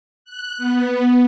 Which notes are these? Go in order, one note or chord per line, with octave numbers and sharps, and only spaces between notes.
F#6
B3